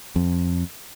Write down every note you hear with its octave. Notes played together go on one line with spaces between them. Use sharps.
F2